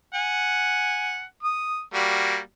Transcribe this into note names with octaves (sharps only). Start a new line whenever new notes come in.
F#5 G#5
D#6
G3 A#3 F#4